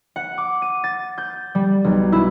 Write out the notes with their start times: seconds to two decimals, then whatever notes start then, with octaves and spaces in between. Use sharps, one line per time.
0.16 F#5
0.38 D6
0.62 D#7
0.84 A6
1.18 G6
1.55 G3
1.84 B1
2.12 E4